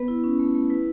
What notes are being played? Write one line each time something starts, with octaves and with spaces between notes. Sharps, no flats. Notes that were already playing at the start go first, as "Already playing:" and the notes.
Already playing: B3 B4
E4
C#4
A3
A3
E4 B4